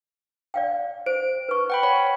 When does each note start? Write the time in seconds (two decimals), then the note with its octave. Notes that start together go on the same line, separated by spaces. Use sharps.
0.54 D5 F5 G5
1.06 C5 D7
1.49 B4 C#6
1.70 F#5 G5 B5
1.83 C#5 B5